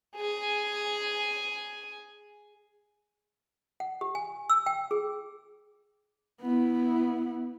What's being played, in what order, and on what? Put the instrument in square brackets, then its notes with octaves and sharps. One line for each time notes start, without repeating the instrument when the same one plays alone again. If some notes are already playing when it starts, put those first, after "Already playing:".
[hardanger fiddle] G#4 G#5
[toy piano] F#5
G4
G#5
E6
G5
G#4
[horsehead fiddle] B3 E4